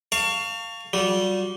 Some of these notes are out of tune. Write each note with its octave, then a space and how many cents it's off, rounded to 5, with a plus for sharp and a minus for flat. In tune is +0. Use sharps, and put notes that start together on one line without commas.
F5 +5 A5 +40 C#6 +20
G3 -20 F#4 -35